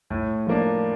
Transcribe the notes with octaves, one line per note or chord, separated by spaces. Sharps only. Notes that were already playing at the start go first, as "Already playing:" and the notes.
A2
F3 A#3 D4